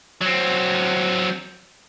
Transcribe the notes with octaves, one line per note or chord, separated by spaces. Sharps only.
F#3 C4